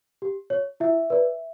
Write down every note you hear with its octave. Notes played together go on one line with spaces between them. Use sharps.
G4
C#5
E4 E5
B4 D5